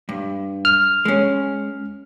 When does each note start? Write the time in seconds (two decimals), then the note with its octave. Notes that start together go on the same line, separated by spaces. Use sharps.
0.09 G2
0.65 F6
1.05 G#3 C#4